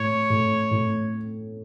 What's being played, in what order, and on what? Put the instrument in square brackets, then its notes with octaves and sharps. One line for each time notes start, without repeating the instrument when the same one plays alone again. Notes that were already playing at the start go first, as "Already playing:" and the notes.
Already playing: [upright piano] A2 [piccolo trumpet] C#5
[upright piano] A2
A2